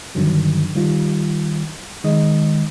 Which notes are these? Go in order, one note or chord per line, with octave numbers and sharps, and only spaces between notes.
G2 D3 D#3 F#3
D#3 G3 F4
D#3 G#3 D#5